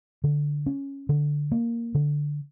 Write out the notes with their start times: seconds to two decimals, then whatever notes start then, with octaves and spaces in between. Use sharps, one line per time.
0.24 D3
0.66 C#4
1.09 D3
1.52 A#3
1.95 D3